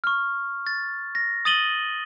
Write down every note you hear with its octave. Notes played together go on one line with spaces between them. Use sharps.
C#6 F6
A6
A#6
D#6 A6 D#7 F#7 G7